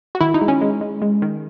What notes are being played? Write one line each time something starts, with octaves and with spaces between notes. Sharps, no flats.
F#4
D#3 E4
D#4
G#3
C#4
G#3
G#3
G#3
D#3